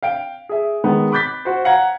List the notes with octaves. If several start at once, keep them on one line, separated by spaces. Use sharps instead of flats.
F5 G5 D7
G#4 E5
D#3 G#3 B3
B5 D6 F#6 G6 A6 B6
F#4 C5
F5 F#5 A#5 G#6